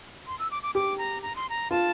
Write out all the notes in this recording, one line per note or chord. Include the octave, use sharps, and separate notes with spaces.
C6
E6
D6
D6
G4 D6
A#5
A#5
C6
A#5
F4 A5